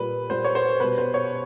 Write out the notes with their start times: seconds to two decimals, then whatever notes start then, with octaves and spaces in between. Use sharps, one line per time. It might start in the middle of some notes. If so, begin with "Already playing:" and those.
Already playing: A#2 G3 B4
0.30 A#2 G3 C5
0.44 C#5
0.55 C5
0.80 B2 G3 B4
0.98 C5
1.14 C#5